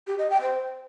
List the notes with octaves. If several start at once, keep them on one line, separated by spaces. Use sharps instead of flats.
G4
D#5
G5
C5